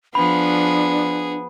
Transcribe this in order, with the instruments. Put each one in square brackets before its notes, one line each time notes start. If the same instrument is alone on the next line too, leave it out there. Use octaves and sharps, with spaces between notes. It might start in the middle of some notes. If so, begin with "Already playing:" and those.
[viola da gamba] F3 [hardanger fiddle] B3 G#4 [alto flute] D4 [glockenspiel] B5